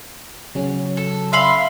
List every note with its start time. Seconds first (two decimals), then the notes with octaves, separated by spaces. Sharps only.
0.55 C#3 F#3 C#4
0.97 A4
1.33 E5 F5 B5 C6